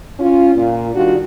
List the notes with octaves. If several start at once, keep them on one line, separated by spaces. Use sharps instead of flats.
C#4 F4
A#2
D#3 G3 D4 F4 F#4